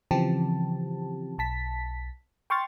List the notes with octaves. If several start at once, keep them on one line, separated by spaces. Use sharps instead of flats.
C#3 E3 F3 C4 G4 A5
B1 A5 B6
G5 C6 C#6 F6 A6